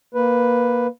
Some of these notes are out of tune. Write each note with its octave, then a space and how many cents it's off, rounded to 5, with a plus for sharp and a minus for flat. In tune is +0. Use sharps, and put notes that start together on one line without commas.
A#3 +15 B4 +0